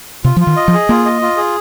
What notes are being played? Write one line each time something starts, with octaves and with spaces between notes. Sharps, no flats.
C3 F4
F3 F4
D#3
D#5
F3
G#4
A#3 F4
D#5
F4
G#4